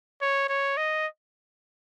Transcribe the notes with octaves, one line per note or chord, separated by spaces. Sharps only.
C#5
C#5
D#5